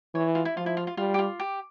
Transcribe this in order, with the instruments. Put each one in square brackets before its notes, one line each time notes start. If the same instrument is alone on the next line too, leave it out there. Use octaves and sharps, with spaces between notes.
[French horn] E3 [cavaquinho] C#5
[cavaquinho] F4
E4
[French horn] F3 [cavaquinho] F4
[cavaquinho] E4
F4
F4
[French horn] G3 [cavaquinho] F4
[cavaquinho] G4
F4
G4